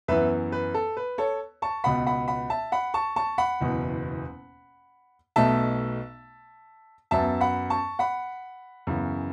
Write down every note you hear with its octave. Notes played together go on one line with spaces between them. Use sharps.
F#2 E3 B3 B4 E5
B4
A4
B4
A4 C#5
A5 C#6
C#2 B2 B3 F#5 B5
F#5 B5
F#5 B5
E5 A5
F#5 B5
A5 C#6
A5 C#6
F#5 B5
F#1 E2 B2
B1 B2 A3 E5 A5
F#2 F#3 B3 E5 A5
F#5 B5
A5 C#6
F#5 B5
F#2 C#3 E3 B3